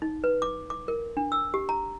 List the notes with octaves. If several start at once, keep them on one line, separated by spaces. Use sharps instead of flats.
D#4
B4
D6
D6
A#4
D4
E6
G4
A#5